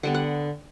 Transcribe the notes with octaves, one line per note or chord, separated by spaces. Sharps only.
D3 G3 B3 F#5
F#5